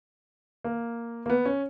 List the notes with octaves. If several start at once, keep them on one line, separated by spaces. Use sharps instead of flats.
A#3
A#3
B3
C#4